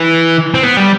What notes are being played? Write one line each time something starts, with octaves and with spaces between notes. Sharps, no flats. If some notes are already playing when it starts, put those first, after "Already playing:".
Already playing: E3
C4
B3
G3